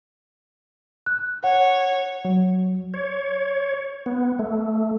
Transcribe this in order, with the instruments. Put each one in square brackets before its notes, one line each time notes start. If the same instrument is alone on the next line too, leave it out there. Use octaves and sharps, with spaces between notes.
[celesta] F#6
[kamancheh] C#5 [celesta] F#5
[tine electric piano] F#3
[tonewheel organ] C#5
B3
A3